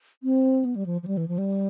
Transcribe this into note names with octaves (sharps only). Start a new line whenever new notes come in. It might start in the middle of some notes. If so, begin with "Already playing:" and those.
C4
B3
G3
F3
F3
G3
E3
F3
G3